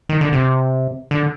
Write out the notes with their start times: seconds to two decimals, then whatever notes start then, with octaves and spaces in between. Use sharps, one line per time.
0.09 D#3
0.21 D3
0.32 C3
1.11 D3